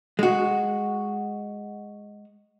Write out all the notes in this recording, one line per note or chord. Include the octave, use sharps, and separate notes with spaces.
G#3 F#4